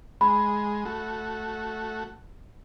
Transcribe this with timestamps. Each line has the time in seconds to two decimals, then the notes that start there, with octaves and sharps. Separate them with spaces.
0.21 G#3 B5
0.85 A3 F#4